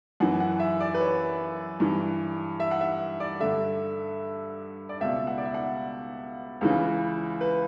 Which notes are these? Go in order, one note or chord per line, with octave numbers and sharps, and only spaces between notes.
F#2 E3 F#5
F#5
E5
D5
B4
C#5
G2 E3
E5
F#5
E5
D5
G2 D3 E5
D5
C#2 B2 E5
F#5
D5
E5
F#5
C#2 C#3 E3
B4